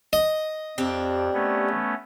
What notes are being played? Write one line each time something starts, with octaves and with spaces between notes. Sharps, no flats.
D#5
F2 C4 D4 G4
A3 B3 C#4